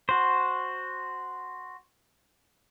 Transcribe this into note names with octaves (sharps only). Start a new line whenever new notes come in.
F#4 C5